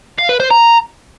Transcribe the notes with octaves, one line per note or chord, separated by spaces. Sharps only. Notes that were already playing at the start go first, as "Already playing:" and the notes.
F5
B4
C5
A#5